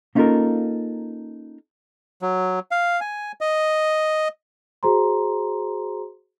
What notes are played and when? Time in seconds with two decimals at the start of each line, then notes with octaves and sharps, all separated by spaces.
0.15 A#3 C#4 D#4 F4 A4 A#4
2.22 F#3
2.71 F5
3.00 G#5
3.41 D#5
4.83 F#4 G#4 C5 A#5 C6